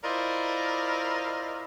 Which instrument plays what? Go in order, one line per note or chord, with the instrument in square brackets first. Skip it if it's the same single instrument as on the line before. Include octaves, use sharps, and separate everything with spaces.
[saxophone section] E4 F4 A#4 C5 D5 D#5